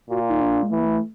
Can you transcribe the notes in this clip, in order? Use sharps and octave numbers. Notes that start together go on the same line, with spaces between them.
A#2 F#4
F4
D#4
D4
G#3
E3 A3
A#3
A3